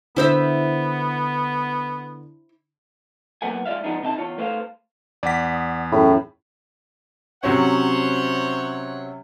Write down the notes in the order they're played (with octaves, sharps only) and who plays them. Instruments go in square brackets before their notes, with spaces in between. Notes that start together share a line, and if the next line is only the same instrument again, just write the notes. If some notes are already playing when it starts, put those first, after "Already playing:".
[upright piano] D3 [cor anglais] B3 [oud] E4 C5 E5
[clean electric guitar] B2 F#3 A#3 B4 F#5 G#5
G#3 F4 D5 E5 F5
G#2 F3 G#3 B3 D4 D#4
C3 D#4 D#5 A5
E2 F4 C#5
A3 B4 C5 E5 F5
[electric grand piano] E2 B6 [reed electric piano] D5 F#5
[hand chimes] D#6
[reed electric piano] F#2 B5 [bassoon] A2 [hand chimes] C#4 E4 G#4
[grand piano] C3 F#3 C#4 [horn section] C5 C#5 F#5